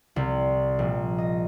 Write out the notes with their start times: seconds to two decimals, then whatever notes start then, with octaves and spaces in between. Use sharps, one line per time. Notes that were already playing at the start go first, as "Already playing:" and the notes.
0.16 C2
0.79 A#1
1.18 D#5